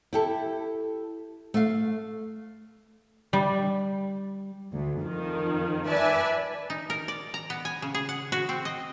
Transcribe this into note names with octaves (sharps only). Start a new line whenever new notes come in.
E4 G4 A4
A3 F5
G3
D2
F2 D#3 F3
B4 D5 E5 G#5 A5
D#4
A#4
D5
A#5
B3
G#5
C#3
G#4
F#5
F#4
C4
D#5